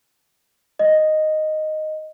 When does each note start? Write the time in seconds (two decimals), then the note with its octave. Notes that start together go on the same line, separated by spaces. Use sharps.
0.79 D#5